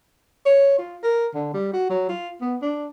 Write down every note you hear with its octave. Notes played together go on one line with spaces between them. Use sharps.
C#5
F4
A#4
D3
G3
F#4
F#3
F4
B3
D4